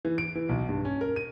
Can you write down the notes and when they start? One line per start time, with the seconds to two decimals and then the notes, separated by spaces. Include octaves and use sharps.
0.05 E3
0.18 D7
0.35 E3
0.49 B1
0.69 G2
0.85 C#4
1.01 A#4
1.16 D#7